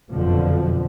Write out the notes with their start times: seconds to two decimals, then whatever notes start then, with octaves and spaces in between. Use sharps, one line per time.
0.11 F#1 F2 B2 D3 F3